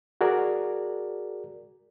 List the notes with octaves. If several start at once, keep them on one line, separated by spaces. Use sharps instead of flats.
F#4 G#4 A#4 D5